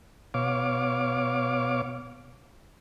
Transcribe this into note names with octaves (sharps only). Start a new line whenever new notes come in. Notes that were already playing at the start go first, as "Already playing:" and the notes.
B2 C#5 F5 D6